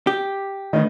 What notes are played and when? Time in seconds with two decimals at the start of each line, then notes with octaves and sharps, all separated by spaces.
0.07 G4
0.73 D#3 A3 D4 B4 D#5